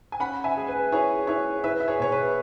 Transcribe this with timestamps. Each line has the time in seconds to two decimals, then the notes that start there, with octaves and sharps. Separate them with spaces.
0.12 G#5
0.20 C#4 F#5 B5
0.44 E5 G#5
0.56 G#3 G#4
0.68 B4
0.92 E4 G#4 C#5
1.27 E4 G#4 C#5
1.64 E4 B4 E5
1.80 E5
1.88 G#4 C#5
2.00 B2 C#5
2.12 B4